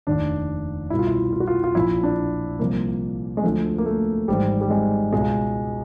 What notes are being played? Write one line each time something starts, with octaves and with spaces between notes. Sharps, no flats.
F1 D#2 D#3 D4
C2 B2 E4
F4
E4
F4
F#4
F4
F4
A#1 A#2 F3 E4
D4
C2 C3 F3 A#3
G#3
D2 D3 F3 A3
A#3
A3
G#1 G#2 E3 G3
G3
G#3
C#2 B2 G#3